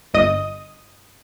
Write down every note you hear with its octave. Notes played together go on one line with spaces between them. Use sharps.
G1 D#5 D#6